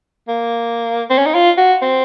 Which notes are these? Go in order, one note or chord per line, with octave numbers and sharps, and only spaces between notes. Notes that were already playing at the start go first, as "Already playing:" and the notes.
A#3
C4
C#4
D#4
F4
F#4
C4